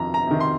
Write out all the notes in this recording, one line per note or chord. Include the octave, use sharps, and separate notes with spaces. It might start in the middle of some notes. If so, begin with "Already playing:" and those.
Already playing: F2 C3 D#3 A#5
A#5
C3 D#3
C6